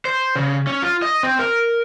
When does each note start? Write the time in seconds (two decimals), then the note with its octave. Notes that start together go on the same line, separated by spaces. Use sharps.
0.05 C5
0.36 C#3
0.67 C#4
0.82 F4
1.02 D#5
1.23 C4
1.39 A#4